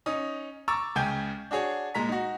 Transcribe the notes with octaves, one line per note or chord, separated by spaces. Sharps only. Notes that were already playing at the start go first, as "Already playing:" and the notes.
C#4 D#4 D#6
A#5 C#6 D6 E6 A6
C#2 C#3 G5 G#5 G6
D4 F#4 G#4 C#5
A#2 G#3 A#5 B6
D#4 F#4